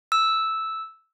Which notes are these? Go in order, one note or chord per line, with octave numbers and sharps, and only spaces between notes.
E6